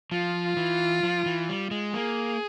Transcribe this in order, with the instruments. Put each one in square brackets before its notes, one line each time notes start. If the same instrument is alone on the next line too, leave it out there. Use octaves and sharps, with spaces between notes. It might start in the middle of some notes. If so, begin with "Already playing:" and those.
[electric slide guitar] F3 [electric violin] F4
[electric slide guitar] E3
F3
E3
G3
G#3
[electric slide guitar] A#3 [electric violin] G#4